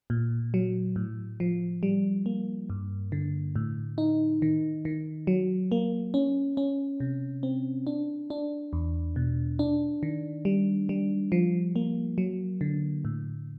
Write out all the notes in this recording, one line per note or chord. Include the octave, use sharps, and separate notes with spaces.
A#2
F#3
A2
F3
G3
A#3
G2
D3
A2
D#4
D#3
D#3
F#3
A#3
C#4
C#4
C3
C4
D4
D4
E2
B2
D4
D#3
G3
G3
F3
A#3
F#3
D3
A2